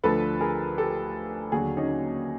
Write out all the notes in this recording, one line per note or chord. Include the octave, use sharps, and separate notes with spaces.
D2 D3 F3 A4 B4
G#4 A#4
G4 A4
D#2 D3 F#3 F#4 G#4
C#4 D#4